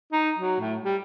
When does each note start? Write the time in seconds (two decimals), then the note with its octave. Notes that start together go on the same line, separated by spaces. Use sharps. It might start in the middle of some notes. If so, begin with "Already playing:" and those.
0.13 D#4
0.39 F#3
0.60 A2
0.84 G3